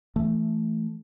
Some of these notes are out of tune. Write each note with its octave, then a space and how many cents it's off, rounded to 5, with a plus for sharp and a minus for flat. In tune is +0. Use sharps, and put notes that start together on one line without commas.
E3 +15 A3 +0